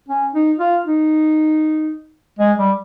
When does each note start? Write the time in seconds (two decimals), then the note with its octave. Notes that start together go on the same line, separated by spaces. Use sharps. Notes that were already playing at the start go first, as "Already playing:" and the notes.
0.09 C#4
0.34 D#4
0.59 F4
0.85 D#4
2.39 G#3
2.58 G3